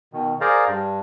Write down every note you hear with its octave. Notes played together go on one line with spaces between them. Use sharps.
B2 D#3
G#4 A#4 C5 D5 F5 A#5
G2